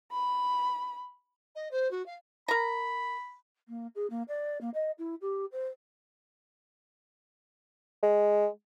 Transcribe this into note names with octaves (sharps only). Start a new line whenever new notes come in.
B5
D#5
C5
F#4
F5
A#4 A#5 B5
A#3
G#4
A#3
D5
A#3
D#5
E4
G4
C5
G#3